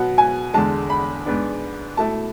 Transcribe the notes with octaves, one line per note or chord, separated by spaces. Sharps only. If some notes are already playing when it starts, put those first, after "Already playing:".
Already playing: B2 F#3 B3 F#5
G#5
E2 D3 G#3 A5
B5
G#2 G#3 B3 D4
B2 A3 E4 A5